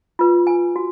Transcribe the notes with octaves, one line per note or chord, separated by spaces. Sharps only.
F4 B4
F4 B4 G#5
F#4